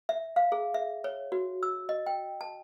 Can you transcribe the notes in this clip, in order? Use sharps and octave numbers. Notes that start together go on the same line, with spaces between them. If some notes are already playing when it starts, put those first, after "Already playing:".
E5
F5
G#4
E5
C#5
F#4
E6
D#5
G5
A5